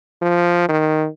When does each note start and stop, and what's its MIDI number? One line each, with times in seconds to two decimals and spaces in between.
0.22 0.67 53
0.69 1.07 51